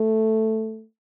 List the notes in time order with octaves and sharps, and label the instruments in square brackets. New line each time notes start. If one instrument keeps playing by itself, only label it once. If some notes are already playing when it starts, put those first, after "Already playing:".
Already playing: [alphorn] A3